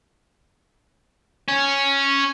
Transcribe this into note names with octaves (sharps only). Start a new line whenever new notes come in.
C#4